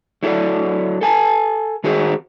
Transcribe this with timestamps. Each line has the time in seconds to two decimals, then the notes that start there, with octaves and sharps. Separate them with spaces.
0.23 F#3 E4 A4 D5
1.01 A4 G#5 A5
1.84 D#3 F#4 G#4 C5